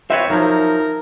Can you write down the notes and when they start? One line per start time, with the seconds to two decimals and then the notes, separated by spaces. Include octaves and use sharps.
0.10 C4 B4 C#5 E5
0.30 F3 F#3 D#4 A#4